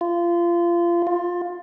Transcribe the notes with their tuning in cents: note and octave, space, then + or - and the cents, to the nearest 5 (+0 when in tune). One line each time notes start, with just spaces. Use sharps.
F4 -25
F4 +15